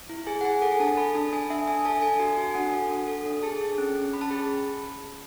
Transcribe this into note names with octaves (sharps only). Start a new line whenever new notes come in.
E4
G#4 G#5
F#5
G#4 G#5
A4 F#5
G#5
D4 A5
A4 B5
D4 A5
D4 G#5
D4 E5
D4 G#5
G#5
A4 A5
A4 G#5
F#4 G#5
F#4 G#5
G#5
D4 F#5
A4
D4
A4
D4
G#4 A5
G#4
C#4
C#4
C#4 B5
A5
G#4 B5